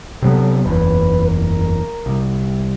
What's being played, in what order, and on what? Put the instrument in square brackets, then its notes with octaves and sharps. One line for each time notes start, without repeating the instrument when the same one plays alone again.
[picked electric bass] C3 F#3 B3 [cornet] A4
[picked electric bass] F#1 E2 [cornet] B4
[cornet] A#4
[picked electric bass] C2